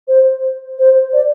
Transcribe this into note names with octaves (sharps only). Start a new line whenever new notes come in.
C5
C5
D5